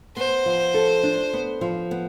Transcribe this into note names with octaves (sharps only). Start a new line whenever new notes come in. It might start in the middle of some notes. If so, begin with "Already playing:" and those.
B3 C5
F3
A4
D4
B3
F3
B3